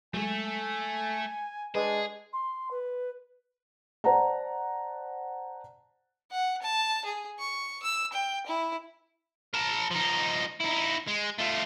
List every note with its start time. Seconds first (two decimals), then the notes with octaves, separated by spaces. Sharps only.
0.14 F#3 G#3 A3 A4 G#5
0.47 G#5
1.75 G#3 D4 G#4 B4 D#5 G#5
2.33 C6
2.71 B4
4.04 C5 D5 F#5 A5 A#5
6.32 F#5
6.62 A5
7.05 G#4
7.39 C#6
7.83 E6
8.13 G5
8.46 E4
9.54 A#4 A5
9.91 F3 D#4
10.60 D#4 E4
11.07 G#3
11.38 A3 F4